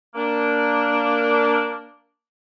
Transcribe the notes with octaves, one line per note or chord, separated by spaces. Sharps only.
A#3 D4